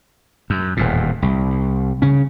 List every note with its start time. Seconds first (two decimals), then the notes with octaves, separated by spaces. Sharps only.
0.50 F#2
0.77 D#1 E2 A2
1.22 C2
2.02 C#3 C#4